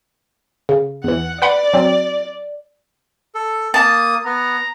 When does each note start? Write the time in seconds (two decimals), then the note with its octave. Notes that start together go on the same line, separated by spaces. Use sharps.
0.69 C#3
1.04 E2 E3 F#5
1.42 B4 D5 F#5 B5
1.73 F#3 C4
3.35 A4
3.74 A#3 A5 D#6
4.25 B3 A#5